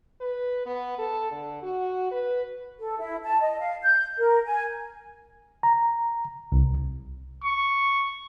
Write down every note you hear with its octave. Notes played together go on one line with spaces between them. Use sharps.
B4
B3
A4
D3
F#4
B4
A4
E4
A5
D#5
F5
G6
A#4
G#5
A#5
C2
C#6